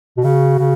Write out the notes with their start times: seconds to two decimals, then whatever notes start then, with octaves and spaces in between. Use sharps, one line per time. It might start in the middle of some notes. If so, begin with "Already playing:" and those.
0.17 B2
0.24 C#3 F#4
0.59 C#3